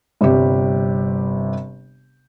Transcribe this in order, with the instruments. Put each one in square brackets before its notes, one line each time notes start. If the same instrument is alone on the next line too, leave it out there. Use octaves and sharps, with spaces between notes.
[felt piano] G1 C3 G3 G4